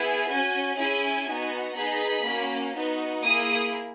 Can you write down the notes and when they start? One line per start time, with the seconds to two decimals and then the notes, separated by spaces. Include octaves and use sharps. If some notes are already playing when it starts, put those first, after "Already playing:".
Already playing: B3 E4 G#4
0.29 C#4 F#4 G#5
0.78 C#4 E4 G#4 G#5
1.27 B3 D#4 F#4
1.76 B3 D#4 G#4 B5
2.24 A#3 C#4 F#4
2.74 B3 D#4 F#4
3.23 A#3 E4 G#4 D#6